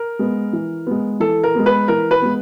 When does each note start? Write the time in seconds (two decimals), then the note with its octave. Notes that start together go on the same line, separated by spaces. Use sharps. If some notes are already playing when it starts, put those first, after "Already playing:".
Already playing: A#4
0.19 G#3 B3
0.53 E3
0.87 G#3 B3
1.20 E3 A4
1.44 A#4
1.55 G#3 B3
1.66 B4
1.88 E3 A#4
2.11 B4
2.22 G#3 B3